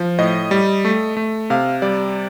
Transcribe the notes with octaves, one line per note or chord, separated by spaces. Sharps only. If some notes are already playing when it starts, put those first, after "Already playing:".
Already playing: F3
A2 D#5
G3
A3
A3
C3 F5
G3 D5